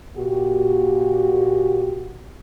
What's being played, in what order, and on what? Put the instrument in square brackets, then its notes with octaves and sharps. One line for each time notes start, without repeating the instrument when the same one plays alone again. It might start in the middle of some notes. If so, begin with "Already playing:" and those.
[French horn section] A#2 F#4 G4